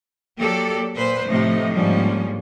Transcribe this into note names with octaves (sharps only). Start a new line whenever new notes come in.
F#3 A#3 G4 A4 D5
A#2 B4 C5
A2 C3 F3 D#4
G#2 D3 F3 G3 A#3 C#4